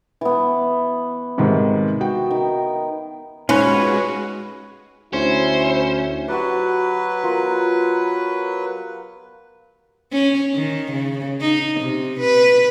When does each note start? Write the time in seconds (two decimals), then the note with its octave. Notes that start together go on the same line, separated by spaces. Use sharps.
0.21 E3 B3
1.38 G#2 C3 D#3
2.00 F#4 G5
2.30 D#3
3.49 G#3 C#4 D#4 F4 F#4 B4 C#5
5.13 D2 C#4 E4 C5
6.28 F#3 F#4 G4 B4 D5
7.24 B3 F4 A#4
10.12 C#4
10.55 D#3
10.92 C#3
11.41 D#4
11.80 C3
12.20 B4